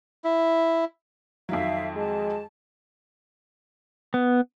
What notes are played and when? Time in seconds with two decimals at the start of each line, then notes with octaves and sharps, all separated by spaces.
0.24 E4
1.49 F2 D#3 F#3 E5 F5
1.96 G#3 A5
4.14 B3